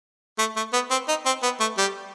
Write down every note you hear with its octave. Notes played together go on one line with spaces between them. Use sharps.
A3
A3
B3
C4
D#4
C4
B3
A3
G3